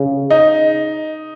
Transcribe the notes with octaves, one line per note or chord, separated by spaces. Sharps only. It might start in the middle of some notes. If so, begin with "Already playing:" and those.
Already playing: C#3
D#4